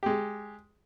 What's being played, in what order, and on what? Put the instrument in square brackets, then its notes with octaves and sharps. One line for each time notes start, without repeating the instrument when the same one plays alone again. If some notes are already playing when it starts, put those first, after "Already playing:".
[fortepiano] G#3 G4